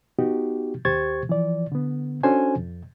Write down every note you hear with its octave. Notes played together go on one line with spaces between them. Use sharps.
B3 D#4 F#4 G4
D#2 G4 C5 C#6 G#6 A6
E3 F3 D5
D3 B3
C#4 D4 F#4 A4 C5 G#5
F2